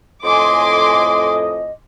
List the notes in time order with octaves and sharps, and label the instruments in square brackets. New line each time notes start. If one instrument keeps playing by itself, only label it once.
[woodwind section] F2 A2 D#5 [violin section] G#5 C6 D6